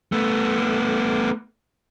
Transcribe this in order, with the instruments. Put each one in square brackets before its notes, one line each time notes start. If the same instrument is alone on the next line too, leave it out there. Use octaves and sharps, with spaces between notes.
[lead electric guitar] A3 B3